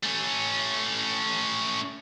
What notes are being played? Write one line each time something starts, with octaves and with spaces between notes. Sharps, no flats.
A3 C#4